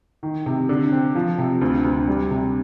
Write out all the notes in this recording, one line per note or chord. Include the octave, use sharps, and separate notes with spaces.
D#3
C3
D3
C4
F3
C3
D2
D2
G3
C3